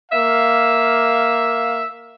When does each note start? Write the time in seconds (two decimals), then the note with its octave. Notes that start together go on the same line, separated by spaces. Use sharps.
0.12 A#3 E5 F5